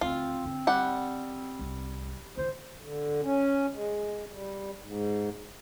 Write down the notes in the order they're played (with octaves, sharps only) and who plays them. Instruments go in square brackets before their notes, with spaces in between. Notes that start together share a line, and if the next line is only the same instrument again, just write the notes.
[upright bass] D2 [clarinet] C4 [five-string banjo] F4
[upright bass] D3 D4
[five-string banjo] G3 F#5
[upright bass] C2
[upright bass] D#3 E4 [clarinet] C5
[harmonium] D3
C#4
G#3
G3
G#2